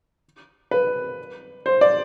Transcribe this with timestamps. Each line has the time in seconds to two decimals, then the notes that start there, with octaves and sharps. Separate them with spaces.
0.71 B4
1.66 C5
1.81 D5